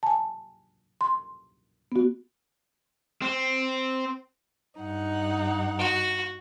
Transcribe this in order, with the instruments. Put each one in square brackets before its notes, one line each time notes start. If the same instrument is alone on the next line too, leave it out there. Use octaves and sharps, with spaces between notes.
[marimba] G#5 A5
C6
B3 F#4
[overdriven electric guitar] C4
[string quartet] G2 D#4 F#5
[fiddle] F#4